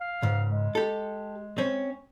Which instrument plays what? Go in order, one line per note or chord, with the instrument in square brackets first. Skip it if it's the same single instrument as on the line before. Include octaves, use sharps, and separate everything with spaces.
[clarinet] F5
[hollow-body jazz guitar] C#2 G#2
[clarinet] G#3
[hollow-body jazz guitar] G4 A4
C4 C#4